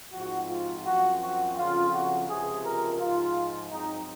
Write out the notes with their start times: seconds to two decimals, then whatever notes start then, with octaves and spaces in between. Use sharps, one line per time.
0.13 G#2 F3 C4 F#4
0.48 F4
0.84 F#2 F3 C4 F#4
1.20 F#4
1.56 F2 C#3 F3 F4
1.93 F#4
2.28 C#2 C3 F3 G#4
2.63 A#4
2.99 G#2 F3 G#3 F4
3.71 G#2 F#3 C4 D#4